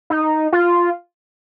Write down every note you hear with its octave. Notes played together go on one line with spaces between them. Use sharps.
D#4
F4